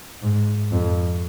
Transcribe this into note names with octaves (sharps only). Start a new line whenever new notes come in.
G#2
F2